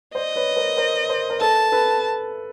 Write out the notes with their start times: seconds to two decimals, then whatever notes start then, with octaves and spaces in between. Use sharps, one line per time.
0.15 C5 D5 D#5
0.35 B4 C#5
0.56 A#4 C5
0.77 A#4 C5
1.09 A#4 C5
1.30 A#4
1.41 A4 B4 A5
1.72 A4 B4